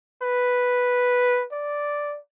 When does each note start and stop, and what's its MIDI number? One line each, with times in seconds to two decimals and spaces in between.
0.22 1.45 71
1.52 2.19 74